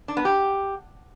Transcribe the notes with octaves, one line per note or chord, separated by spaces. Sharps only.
D4
B3
G4